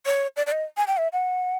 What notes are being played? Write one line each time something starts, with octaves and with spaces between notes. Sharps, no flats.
C#5
D5
D5
D#5
G#5
G5
E5
F#5